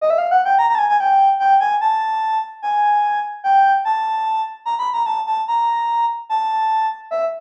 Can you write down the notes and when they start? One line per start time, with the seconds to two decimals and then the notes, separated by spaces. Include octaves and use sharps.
0.01 D#5
0.10 E5
0.18 F5
0.31 F#5
0.45 G5
0.59 A#5
0.70 A#5
0.75 A5
0.79 G#5
0.90 G#5
1.00 G5
1.40 G5
1.60 G#5
1.81 A5
2.62 G#5
3.44 G5
3.85 A5
4.65 A#5
4.79 B5
4.94 A#5
5.06 A5
5.27 A5
5.48 A#5
6.29 A5
7.11 E5